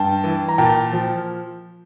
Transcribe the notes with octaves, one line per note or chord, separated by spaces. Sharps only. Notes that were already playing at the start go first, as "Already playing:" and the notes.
Already playing: G2 G5 A5
E3
A#5
A#2 G5 A5
F3